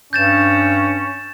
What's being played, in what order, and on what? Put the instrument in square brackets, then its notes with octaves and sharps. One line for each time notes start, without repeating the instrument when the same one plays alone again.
[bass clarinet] G2 [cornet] C#4 [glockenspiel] G6 A6 E7